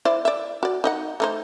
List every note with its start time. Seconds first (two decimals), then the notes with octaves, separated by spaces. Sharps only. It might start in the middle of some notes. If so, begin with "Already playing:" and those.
0.05 E4 C5 D5
0.25 D5 E5
0.63 F#4 D5
0.84 D#4 D#5 F#5
1.20 A3 D#4 C5